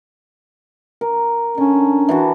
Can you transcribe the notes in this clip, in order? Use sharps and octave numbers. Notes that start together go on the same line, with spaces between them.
A#4
D3 C#4
E3 D4 F#4